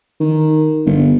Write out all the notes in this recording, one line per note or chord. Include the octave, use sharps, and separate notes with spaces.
D#3
G1